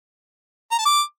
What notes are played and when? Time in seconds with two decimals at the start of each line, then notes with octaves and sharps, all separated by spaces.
0.72 A#5
0.78 A5
0.85 D6